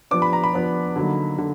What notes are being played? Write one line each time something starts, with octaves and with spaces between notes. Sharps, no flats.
F3 B3 D4 D6
B5
A#5
B5
F3 B3 D4
D3 F#3 A#3 D#4
D3